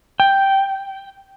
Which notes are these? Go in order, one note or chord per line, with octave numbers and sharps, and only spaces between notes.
G5